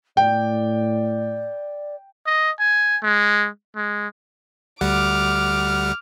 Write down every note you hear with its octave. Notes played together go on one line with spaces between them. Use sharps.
A2 D5 G5
D#5
G#5
G#3
G#3
D2 G3 F#5 D6 F6